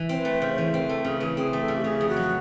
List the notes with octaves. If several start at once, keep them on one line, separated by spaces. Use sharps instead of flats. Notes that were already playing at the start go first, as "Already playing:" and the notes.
Already playing: E3
C4 C5
B4
A3
C#3 C5
C5
E3
C5
C4 A#4
A#4
A3 A4
C#3 G#4
E3 G#4
C4 G#4
A3
A4
C#3
G4
C#3 G#4
F2
F#4
F#3